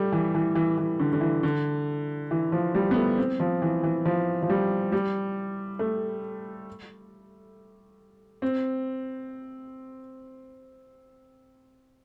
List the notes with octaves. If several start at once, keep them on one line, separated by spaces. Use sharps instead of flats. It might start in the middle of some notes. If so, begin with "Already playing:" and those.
Already playing: G3 A3
E3
E3
E3
E3
D3
D3
E3
D3
E3
F3
G3
B3
A3
C4
F3
E3
E3
F3
F3
G3
G3
A3
C4